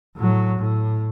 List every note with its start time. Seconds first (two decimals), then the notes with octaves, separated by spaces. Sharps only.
0.16 A2 F#3
0.58 A2